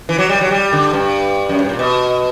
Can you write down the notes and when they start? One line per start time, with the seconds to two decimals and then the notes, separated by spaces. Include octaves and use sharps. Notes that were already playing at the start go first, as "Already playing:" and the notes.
0.09 E3
0.18 F#3
0.29 G3
0.41 F#3
0.51 G3
0.73 D3
0.93 G2
1.49 F#2
1.59 G2
1.69 A#2
1.79 B2